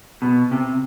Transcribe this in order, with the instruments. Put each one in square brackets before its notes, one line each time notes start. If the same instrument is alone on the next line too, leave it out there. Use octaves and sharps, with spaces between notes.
[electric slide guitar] B2
C3